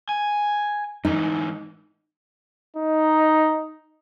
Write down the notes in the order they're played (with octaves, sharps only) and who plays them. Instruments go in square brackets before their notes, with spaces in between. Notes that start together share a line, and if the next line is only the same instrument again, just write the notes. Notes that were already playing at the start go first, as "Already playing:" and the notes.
[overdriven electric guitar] G#5
[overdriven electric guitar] G#2 E3 [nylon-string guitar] D#4
[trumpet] D#4